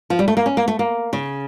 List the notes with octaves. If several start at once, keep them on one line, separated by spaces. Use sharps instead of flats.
F3
G3
A3
A#3
C#4
A#3
A3
A#3
C#3